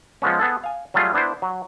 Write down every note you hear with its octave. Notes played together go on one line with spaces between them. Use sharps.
F3 G#3 B3 C#4
B3 G#4 A4
F5 G#5
F#3 G3 A3 F4 G#4
B3 D4 E4 B4 C5
F#3